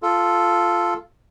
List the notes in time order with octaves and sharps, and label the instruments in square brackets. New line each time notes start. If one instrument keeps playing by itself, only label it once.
[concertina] F4 A4